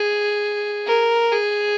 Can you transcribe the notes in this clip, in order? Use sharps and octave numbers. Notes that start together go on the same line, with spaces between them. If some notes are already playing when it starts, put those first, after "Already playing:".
Already playing: G#4
A#4
G#4